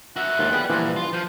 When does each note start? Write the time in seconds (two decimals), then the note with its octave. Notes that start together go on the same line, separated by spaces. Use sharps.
0.16 F#4 E5 F#5
0.39 D#2 G#2 F4
0.53 B3 G#4 B4 D5 G5
0.70 G2 A#2 E3 F3
0.96 F4
1.13 F3 C5